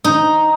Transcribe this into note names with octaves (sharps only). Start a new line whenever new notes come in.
D#4